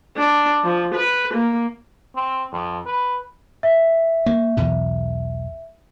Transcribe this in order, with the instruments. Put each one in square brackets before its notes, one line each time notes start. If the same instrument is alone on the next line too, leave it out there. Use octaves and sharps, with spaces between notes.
[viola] D4
F3
B4
A#3
[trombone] C4
F2
B4
[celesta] E5
[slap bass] A#3
B1 E2 B2